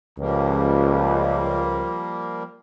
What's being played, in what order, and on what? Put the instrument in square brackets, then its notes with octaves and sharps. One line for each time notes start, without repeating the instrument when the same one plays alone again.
[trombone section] C#2 [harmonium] F3 G3 A#3